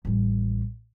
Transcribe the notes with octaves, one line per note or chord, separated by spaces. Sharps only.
A1 G3